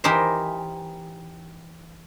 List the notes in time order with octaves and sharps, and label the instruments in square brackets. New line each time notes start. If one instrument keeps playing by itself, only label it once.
[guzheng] E3 D#4 G4 A#4 C5